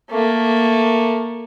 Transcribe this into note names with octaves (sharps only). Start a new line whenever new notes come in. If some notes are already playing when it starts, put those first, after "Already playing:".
A3 A#3